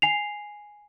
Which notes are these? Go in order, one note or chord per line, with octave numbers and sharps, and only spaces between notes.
G#5 C7 F7